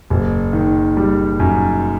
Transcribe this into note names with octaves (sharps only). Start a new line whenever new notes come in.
F#1
D#3
G3
F#2